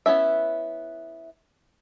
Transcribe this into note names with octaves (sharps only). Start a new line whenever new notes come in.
B3 C#4 E4 E5